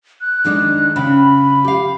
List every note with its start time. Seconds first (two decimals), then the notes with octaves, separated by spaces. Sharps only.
0.21 F#6
0.45 D#3 G#3 D4
0.96 C#3 G5 B5
1.65 G4 F5